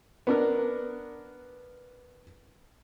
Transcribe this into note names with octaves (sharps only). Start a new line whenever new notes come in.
B3 D4 A#4